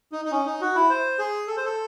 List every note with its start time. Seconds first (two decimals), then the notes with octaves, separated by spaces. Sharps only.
0.12 D#4
0.25 D#4
0.32 C#4
0.46 D#4
0.61 F#4
0.75 E4
0.90 C5
1.19 G#4
1.47 A4
1.57 C5
1.65 A4